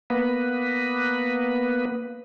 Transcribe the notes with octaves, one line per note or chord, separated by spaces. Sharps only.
A#3 B3 B4